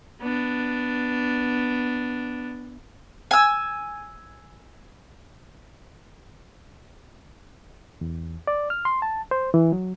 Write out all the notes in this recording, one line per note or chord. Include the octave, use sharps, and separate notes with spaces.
B3 D4
G#5 E6
E2
D5
F6
C6
A5
C5
E3
F#3